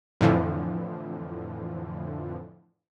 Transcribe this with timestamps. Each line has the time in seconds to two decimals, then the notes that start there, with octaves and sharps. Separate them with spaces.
0.21 F2 A2 D3 E3 F3